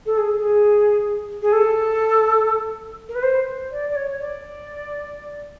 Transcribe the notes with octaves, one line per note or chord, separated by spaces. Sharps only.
A4
G#4
G#4
G#4
A4
A#4
B4
C5
D5
D5
C#5
D5